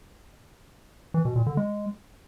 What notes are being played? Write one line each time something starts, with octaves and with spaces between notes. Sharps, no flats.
E3
B2
A#2
D3
G#3